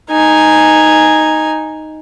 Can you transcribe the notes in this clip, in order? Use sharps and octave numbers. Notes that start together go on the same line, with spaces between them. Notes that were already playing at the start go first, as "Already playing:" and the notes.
D#4 G#5